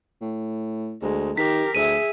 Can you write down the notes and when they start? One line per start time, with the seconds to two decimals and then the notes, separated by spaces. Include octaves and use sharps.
0.21 A2
1.02 D2 G#3
1.37 D#3 G4 A#4 B6
1.75 D2 G#4 E5 D#7